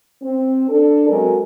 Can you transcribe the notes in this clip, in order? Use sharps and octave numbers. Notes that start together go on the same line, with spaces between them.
C4
D4 A4
F#3 G#3 C4 F#4 A4 A#4